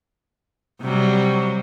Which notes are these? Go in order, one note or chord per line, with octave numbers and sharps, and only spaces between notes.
C3 F#3 G3